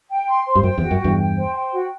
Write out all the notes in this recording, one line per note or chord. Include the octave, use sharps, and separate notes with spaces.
G5
C6
C5
G2
F#2 G5
E2
F#4
F#2
E2 G2 G5
G5
C5
G5
F#4